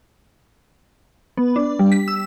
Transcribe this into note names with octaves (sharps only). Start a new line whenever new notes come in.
B3
D4
G3
B6
E6